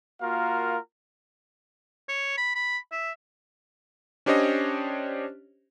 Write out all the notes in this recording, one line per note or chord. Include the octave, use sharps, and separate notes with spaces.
A#3 F4 F#4 A#4 F5
C#5
B5
B5
E5
C#4 D4 G4 C5 C#5 D#5